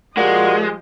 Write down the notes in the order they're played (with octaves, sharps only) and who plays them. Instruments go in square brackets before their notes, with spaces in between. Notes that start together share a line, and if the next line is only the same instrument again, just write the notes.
[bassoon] A#2 [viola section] F3 G4 D#5 [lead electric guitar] G#3 [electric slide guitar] F#4